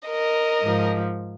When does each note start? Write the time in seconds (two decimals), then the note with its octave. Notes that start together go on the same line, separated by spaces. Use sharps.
0.08 A#4 D#5
0.63 G#2 F3